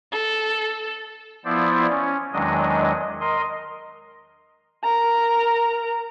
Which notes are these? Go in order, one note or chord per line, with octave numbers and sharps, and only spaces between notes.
A4
F3 B3 E4 C5 D5
C#4
E2 D#3 F#3 G#3 D4 D#5
A#4 D#5 C6
A#4 A#5